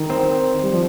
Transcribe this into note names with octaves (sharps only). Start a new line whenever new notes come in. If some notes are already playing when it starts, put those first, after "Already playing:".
Already playing: D#3
C4
G3
F3